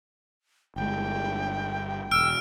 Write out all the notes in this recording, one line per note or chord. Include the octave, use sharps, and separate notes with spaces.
G1 G#3 G5
E1 E6 F6 D7